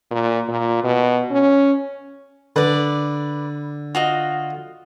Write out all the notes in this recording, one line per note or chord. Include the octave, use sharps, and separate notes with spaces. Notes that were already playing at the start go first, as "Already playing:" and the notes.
A#2
A#2
B2
C#4
D3 B4 D5
F4 F#4 D#5